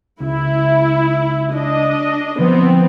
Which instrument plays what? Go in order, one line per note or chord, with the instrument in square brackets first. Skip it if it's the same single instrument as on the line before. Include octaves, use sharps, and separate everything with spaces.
[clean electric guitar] C#2 [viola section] E4
[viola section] D4 D#5
[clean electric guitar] D3 F3 [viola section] B3 C4